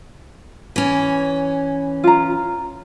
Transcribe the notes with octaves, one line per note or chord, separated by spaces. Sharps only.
E3 C#4
F4 A#5